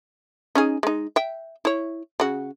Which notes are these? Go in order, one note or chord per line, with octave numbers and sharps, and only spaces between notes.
C#4 D#4 G#4
G#3 D#4
E5 G5
E4 C#5
C#3 F#4